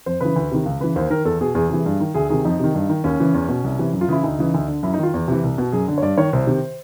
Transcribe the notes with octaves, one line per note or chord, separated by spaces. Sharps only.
F2 C5
C#3 E3 B4
D2
C3 D#3
C#2
C#3 E3 B4
D#2 C5
D#3 A#4
E2 A4
B2 G#4
E2 G#4
C3 E3
G2
D#3
D2 G#4
C3 D#3 G#4
F2 D#4
C3 D#3
G2
D#3
D#2 C#4
C#3 E3
E2
B2
C2
C3 E3
F#2
F4
C#3 E3 E4
D2 D#4
C#3 E3
D2
D3
F#2 E4
D#4
D#3 F4
E2
C3 E3
C2
B2
F#2 G#4
D3
C#5
G2 D5
D#3 C#5
C2 C5
C3 D#3